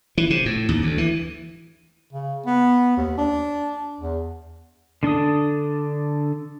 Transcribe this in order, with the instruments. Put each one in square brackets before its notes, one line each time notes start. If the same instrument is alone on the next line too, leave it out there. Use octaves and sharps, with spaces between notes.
[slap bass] E3
C3
A2
D#2
D2
E3
[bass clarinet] C#3
B3
D#2
D4
E2
[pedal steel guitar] D3 D4 A4 D#6